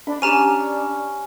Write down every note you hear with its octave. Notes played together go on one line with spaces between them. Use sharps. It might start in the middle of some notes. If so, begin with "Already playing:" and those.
D4 B5
C#4 G4 A#5 D#7